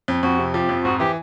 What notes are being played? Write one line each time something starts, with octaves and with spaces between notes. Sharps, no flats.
F2
F2 F#4
C3
F3 G4
F2
G#2 F#4
E3 G4